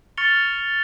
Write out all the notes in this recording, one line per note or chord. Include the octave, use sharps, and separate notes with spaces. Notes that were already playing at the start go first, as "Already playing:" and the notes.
C#6 F6 A6 C#7 F7 G7